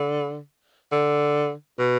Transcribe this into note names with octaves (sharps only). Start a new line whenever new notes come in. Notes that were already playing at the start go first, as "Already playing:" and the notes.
Already playing: D3
D3
B2